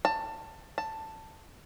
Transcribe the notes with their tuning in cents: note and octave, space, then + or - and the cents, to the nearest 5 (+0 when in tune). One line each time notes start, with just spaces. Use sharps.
A5 +20
A5 +10